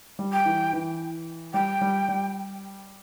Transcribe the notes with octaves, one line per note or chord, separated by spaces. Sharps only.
G3
G5
E3
E3
G3 G5
G3
G3